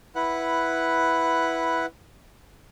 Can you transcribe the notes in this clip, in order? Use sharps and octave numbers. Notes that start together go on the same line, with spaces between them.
E4 B4 F#5